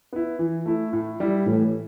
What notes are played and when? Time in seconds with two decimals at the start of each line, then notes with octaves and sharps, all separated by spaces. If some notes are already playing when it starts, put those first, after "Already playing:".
0.13 B3 E4
0.39 E3
0.66 A3 E4
0.93 A2
1.20 G3 E4
1.46 A2 E3